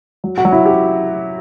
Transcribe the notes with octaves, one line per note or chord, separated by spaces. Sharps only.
F#3
F#4
F#3
E4
G4